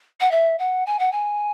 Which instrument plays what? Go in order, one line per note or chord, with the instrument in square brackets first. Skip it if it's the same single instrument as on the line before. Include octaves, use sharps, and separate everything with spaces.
[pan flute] F#5
E5
F#5
G#5
F#5
G#5